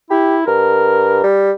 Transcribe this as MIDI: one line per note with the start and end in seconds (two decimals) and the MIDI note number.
0.10 0.46 64
0.10 0.37 67
0.47 1.21 43
0.47 1.23 70
1.24 1.52 55